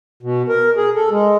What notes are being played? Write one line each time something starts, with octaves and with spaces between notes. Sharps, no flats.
B2
A#4
G#4
A4
G#3